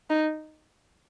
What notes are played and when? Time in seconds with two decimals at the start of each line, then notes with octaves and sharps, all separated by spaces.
0.10 D#4